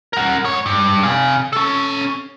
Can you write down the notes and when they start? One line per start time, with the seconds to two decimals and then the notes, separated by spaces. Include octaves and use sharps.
0.13 A#4 F#5
0.45 G#2 C#5
0.66 G2
1.03 F5 G#5
1.53 C#4 A4